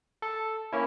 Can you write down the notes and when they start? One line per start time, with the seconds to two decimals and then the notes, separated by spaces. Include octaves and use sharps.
0.22 A4
0.73 A#3 C#4 E4